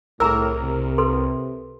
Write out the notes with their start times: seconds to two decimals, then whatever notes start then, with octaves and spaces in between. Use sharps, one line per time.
0.20 C2 A2 G#4 A#4 A#5 E6
0.62 C3
0.98 A4 B4 C6